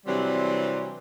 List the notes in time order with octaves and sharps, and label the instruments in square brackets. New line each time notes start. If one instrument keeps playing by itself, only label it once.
[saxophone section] C3 E3 F#3 G3 C4 D4